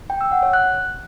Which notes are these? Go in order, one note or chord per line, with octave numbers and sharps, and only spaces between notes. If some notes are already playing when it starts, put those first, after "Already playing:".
G5
E6
F#5
C#5
F#6